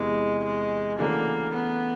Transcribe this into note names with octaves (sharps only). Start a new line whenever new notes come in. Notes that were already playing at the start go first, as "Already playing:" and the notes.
Already playing: E2 C3 E3 G#3
G#3
C#3 E3 A3 A#3 D4 F#4
B3